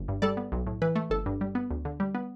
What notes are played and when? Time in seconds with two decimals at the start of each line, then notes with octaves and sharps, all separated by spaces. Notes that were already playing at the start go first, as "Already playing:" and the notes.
Already playing: G1
0.08 G2
0.22 G3 A4 D5
0.37 B3
0.52 B1
0.67 A2
0.82 E3 B4
0.96 A3
1.10 G1 A4
1.26 G2
1.41 G3
1.55 B3
1.70 D2
1.85 D3
2.00 G3
2.15 B3